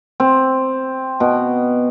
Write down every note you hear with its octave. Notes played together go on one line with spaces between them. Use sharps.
C4
B2